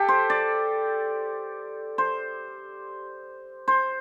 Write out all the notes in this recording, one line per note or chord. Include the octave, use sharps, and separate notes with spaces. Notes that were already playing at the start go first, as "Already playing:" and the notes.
Already playing: G4 A4
C5
D5
C5
C5